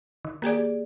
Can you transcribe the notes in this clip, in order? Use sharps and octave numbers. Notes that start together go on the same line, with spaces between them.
D#3
A#3 G4 G#4 D5